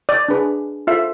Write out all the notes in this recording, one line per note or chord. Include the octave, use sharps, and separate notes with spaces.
D5
D4 G#4 B4
F4 A4 C5 E5